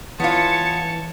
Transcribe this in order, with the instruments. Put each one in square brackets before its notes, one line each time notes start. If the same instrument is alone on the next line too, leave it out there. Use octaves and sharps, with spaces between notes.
[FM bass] E3 [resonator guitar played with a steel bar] B3 F4 [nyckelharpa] C#5 A5 [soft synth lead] C#7